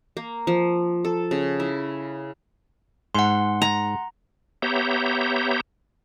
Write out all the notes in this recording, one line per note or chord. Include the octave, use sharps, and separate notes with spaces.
A#3
F3
A4
C#3
E4
G#2 F#5 C6
A#5
B3 G4 C#5 E5 A#5 G6